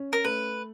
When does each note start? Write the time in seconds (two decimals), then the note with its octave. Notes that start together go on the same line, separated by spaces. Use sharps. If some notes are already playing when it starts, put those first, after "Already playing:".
Already playing: C#4
0.13 A#4
0.24 A3 B4